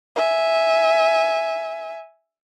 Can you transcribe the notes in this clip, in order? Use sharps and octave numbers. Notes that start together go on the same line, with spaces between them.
E5 G#5